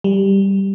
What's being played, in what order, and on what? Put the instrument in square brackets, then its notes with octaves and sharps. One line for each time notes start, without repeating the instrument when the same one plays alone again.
[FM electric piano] G3